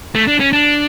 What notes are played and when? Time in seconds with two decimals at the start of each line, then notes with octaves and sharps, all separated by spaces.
0.15 A3
0.28 D4
0.40 C#4
0.53 D4